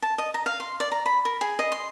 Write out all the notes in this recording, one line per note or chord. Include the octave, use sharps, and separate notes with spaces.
A5
D#5
A#5
F5
C6
D5
A#5
B5
A#4
G#4
D#5
C6